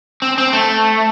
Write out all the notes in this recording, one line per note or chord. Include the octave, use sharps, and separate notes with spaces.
C4
C4
A3